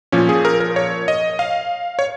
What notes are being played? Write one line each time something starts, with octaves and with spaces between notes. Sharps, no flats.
A#2 F3 C#4
G#4
A#4
A#4
C#5
D#5
F5
C#5